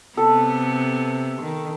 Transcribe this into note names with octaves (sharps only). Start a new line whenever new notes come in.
C3 B3 A4
D#3